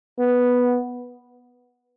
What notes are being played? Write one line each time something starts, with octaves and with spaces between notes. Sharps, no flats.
B3